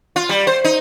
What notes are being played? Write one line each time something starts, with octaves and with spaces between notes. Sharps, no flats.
F4
G3
C5
D#4